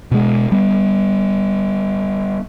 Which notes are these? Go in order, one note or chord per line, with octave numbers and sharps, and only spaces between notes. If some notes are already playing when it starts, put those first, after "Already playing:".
B2 G#3
G3 B3